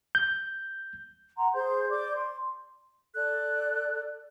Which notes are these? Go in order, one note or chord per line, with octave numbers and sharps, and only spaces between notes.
G6
F#5 A#5 C6
G#4 C5 C6 G6
D5 D6 G6
C6
A4 D5 F#6